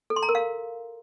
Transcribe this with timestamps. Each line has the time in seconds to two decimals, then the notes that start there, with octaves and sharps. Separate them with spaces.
0.10 A4
0.16 C6
0.23 A#5
0.29 A#4
0.35 F5